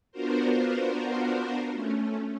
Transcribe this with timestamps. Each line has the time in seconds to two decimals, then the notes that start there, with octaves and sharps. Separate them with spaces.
0.11 B3 D4 F4 F#4 A#4 C5
1.71 A3 C#4